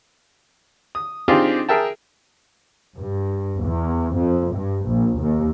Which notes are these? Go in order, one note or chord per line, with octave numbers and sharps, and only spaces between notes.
D#6
C4 D4 D#4 F4 G4 G#4
G#4 A#4 E5 G5 A5
G2
E2
F2
G2
A#1
D#2